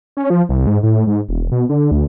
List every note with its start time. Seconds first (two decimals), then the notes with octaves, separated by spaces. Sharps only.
0.17 C#4
0.30 F3
0.49 C2
0.67 G#2
0.83 A2
1.07 G#2
1.29 E1
1.52 B2
1.69 D3
1.91 D2